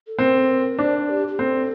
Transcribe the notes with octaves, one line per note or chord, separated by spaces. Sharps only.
A4
C4 A#4
A4
A#4
D4 C5
D5
G4
G4
C4 A4